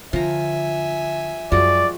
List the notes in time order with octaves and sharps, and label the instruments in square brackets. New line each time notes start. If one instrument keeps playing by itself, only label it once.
[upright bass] D3 [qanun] F3 A#5 [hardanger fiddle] E5 G#5
[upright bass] F#2 [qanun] F3 G#3 F#4 [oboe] D5